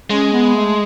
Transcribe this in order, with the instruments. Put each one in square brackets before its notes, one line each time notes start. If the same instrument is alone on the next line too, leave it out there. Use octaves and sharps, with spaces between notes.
[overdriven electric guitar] G#3 [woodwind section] C#4
[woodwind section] B3
A3